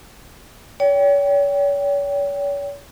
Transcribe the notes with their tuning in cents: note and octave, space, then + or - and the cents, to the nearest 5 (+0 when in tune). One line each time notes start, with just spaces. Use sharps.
C#5 +40 G5 +0